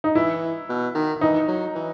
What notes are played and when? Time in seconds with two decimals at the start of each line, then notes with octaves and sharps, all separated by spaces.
0.04 D#4
0.15 E3 E4
0.69 B2
0.95 D#3
1.21 E3 D#4
1.48 F#3
1.76 E3